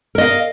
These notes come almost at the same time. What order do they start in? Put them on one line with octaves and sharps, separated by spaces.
A#4 D#5 F5